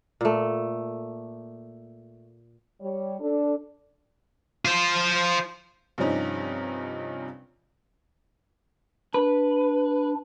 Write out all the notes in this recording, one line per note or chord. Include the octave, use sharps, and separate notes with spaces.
A#2 A3
G3 C#5
D4 A4
F4 C5
G2 C3 F3 C#4 D#4
D4 B4